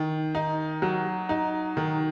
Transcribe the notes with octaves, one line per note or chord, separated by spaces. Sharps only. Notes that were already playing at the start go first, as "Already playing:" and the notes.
Already playing: D#3
D#4
F#3
D#4
D#3